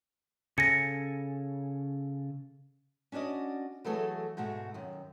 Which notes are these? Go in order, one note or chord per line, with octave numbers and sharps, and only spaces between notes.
C#3 A4 G#5 A#6 C#7
C#4 D4 F#4 D5 D#5
E3 F#3 A3 F#4 G#4 A4
G#2 B2 G#3 A3 F#4
F#2 D#3